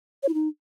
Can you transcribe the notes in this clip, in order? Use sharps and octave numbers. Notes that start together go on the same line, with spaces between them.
C#5
E4
D#4